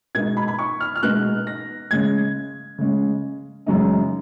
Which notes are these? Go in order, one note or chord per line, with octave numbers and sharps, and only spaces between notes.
B2 G#3 B3 D#4 G#6
B5
B5
C#6
F6
F6
B2 G#3 B3 D#4 F#6
A#6
C#3 G#3 C#4 G#6
C#3 G#3 C#4
F#2 C#3 G#3 D#4